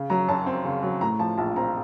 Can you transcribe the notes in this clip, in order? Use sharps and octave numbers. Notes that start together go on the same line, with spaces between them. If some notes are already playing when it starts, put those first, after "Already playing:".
Already playing: C#3
F#3 A#5
F#2 A5
C4
C#3
F#3
A2 A#5
F3 A5
A#1 A5
C4 A#5